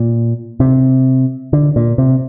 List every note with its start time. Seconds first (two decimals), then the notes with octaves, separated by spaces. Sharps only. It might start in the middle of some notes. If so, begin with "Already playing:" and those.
Already playing: A#2
0.60 C3
1.53 D3
1.76 A#2
1.98 C3